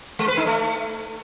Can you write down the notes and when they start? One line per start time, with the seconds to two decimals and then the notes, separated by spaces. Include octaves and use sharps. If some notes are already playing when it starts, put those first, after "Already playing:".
0.19 G#3
0.28 B4
0.37 D#4
0.46 A3